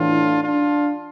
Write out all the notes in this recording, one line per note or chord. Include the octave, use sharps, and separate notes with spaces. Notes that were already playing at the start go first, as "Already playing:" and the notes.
Already playing: A2 E3 D4 F4
D4 F4